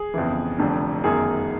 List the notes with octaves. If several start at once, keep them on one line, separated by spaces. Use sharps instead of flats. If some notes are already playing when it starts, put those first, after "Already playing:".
Already playing: G#4
G1 F2 C#3 E3
F1 F2 D3
G1 F#2 D#3 G#4